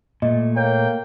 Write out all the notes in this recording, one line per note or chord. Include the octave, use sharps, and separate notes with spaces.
A#2 A3 D#5
A#3 C#5 G5